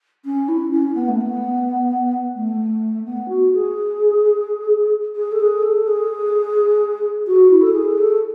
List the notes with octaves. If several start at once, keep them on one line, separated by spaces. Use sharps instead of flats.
C#4
E4
C#4
B3
A3
B3
A3
B3
F#4
G#4
G#4
A4
G#4
A4
G#4
F#4
E4
A4
G#4
A4